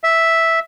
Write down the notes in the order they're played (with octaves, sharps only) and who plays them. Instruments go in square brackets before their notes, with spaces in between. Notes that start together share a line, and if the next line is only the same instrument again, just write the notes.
[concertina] E5